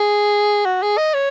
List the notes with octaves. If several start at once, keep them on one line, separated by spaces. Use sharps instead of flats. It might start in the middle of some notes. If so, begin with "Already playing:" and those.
Already playing: G#4
F#4
G#4
D#5
C#5